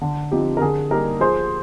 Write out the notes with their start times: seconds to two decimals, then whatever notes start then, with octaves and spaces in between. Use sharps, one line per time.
0.01 D3
0.32 F3 C4 D#4 G4
0.57 A#4
0.61 D3 G#4
0.91 G3 A#3 D#4 G4 A#4
1.21 F3 G#4 C5